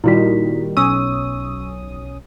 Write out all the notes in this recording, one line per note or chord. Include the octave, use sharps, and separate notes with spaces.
A#2 D#3 G3 E4 F#4 B6
B1 C#4 C#6 D#6 E6